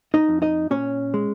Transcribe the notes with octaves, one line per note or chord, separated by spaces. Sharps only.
D#4 D#5
F2
D#4 D#5
A#2 C#4 C#5
G#3